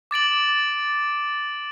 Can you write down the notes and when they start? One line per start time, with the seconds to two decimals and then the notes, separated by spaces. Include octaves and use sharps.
0.11 D6 A6 D7 F#7